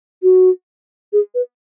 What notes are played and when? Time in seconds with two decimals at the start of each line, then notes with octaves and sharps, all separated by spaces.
0.23 F#4
1.13 G#4
1.35 B4